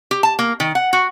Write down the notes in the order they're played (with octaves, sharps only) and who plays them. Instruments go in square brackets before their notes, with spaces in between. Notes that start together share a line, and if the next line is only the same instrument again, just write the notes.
[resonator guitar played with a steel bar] G4
A5
A#3
D#3
F#5
F#4